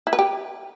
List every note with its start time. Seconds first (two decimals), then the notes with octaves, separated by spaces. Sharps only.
0.07 E4
0.13 B4
0.19 G4